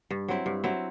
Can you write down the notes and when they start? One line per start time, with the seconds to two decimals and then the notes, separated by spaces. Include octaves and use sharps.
0.10 G2
0.28 F#3 C4 E4
0.46 G2
0.64 F#3 C4 E4